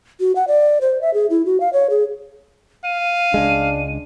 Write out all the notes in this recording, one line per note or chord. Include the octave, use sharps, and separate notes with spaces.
F#4
F#5
D5
C5
E5
G#4
E4
F#4
F5
C#5
G#4
F5 D#7
C#2 G#3 D4